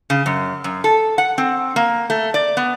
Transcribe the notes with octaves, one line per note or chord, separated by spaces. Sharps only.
C#3
F#2
F#2
A4
F#5
C4
A#3
A3
D5
B3